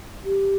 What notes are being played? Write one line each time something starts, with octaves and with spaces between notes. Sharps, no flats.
G4